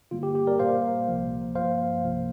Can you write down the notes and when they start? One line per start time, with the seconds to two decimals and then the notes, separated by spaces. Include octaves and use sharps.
0.11 G2 D3 G3 A#3 F4
0.23 G4
0.35 G4
0.47 A#4 D5
0.59 A#2 G3 A#3 C5 F5
1.08 C2 C3 F3 A#3
1.55 G2 F3 A#3 C5 F5
2.04 C2 C3 F3 A#3